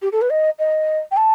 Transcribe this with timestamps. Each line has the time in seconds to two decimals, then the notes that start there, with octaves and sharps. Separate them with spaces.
0.02 G4
0.12 A4
0.21 B4
0.30 D#5
0.59 D#5
1.11 G5
1.17 A5